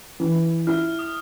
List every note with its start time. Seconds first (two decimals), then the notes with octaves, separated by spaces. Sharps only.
0.20 E3
0.67 E4 F6
0.99 D#6